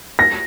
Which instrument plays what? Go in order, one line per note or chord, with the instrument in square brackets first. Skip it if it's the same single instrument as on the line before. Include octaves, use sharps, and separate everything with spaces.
[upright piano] A#6